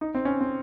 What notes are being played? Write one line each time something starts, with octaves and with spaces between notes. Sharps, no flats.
D#4
C4
C#4
C4